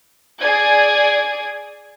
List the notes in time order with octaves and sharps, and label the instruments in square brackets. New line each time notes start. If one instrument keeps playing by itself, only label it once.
[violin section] G#4 D5 G#6